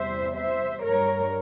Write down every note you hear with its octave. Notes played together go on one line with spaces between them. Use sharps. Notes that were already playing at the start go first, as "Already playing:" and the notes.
Already playing: E2 C3 G3 C5 E5
C5 E5
G2 G3 A#4 C#5